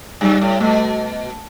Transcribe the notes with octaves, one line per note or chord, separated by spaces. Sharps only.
G2 G3
A2
B2 A3